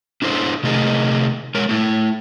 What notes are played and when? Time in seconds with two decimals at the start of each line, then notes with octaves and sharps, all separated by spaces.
0.22 D4 E4 A4 C5
0.63 C3 A3 D#4 G#4 A#4
1.55 G#3 A#4 C#5
1.69 A3 E4